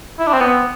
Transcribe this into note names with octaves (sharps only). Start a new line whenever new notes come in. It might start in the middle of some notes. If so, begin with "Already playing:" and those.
E4
D4
C4
B3